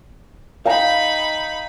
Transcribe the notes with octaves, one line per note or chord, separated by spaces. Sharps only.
D#4 F5 G5 A#5 B5